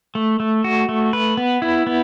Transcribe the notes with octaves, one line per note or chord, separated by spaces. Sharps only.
A3
A3
F#4
A3
B4
B3
E4
B3